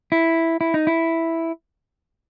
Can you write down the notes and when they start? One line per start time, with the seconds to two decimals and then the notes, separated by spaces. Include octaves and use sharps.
0.12 E4
0.61 E4
0.74 D#4
0.87 E4